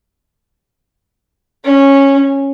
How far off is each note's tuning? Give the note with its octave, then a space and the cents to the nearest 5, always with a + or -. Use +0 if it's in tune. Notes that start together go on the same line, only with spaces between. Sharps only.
C#4 -10